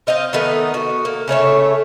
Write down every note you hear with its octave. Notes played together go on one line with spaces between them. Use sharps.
C4 D#5 F5 G5
D#3 A3 B3 D#4
F#4
A#3
C#3 A3 C#5 E5